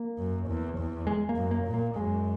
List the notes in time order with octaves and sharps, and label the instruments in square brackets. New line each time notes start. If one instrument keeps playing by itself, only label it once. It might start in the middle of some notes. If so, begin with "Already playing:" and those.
Already playing: [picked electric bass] A#3
[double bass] F#2
E2
E2
[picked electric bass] G#3
A#3
[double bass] F#2
[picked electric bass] A#3
[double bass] A#2
[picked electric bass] A#3
[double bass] F#2 [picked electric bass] G#3